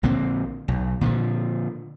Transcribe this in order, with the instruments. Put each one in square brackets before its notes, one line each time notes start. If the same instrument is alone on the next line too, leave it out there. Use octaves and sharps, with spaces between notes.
[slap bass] A#1 D3 A#3 C4
B1
A#2 D3 D#3 F3